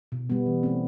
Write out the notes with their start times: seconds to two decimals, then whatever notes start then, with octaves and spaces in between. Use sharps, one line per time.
0.12 B2
0.30 G3 B3
0.46 E3
0.63 A3 C4